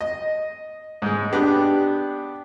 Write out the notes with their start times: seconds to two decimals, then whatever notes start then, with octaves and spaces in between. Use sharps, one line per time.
0.01 D#5
1.02 G#2 G#3
1.32 B3 D4 G4